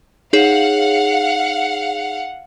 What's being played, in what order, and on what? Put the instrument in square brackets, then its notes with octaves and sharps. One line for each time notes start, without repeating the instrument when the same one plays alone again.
[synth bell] D#4 G#4 C#5 [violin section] F5 F#5